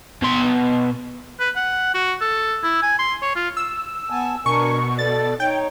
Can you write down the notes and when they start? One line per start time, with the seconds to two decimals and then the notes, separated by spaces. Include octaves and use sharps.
0.22 B2 C6
1.40 B4
1.56 F#5
1.94 F#4
2.21 A4
2.63 E4
2.82 G#5
2.99 C6
3.22 C#5
3.36 F4
3.57 E6
4.10 B3 G#5 A5
4.46 B2 D4 A#4 G#5 C#6
4.99 A4 D5 A6
5.40 D#4 C#5 G5